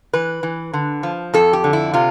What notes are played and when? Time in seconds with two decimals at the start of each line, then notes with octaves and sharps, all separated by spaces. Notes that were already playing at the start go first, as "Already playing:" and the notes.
0.13 E3 B4
0.43 E3
0.73 D3
1.03 F3
1.34 F2 A4
1.53 G4
1.64 D3
1.73 E4
1.94 C3 F4